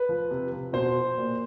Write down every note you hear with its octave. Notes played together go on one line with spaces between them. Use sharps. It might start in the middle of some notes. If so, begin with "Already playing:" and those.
Already playing: B4
F3
C3
F3
B2 C5
A#2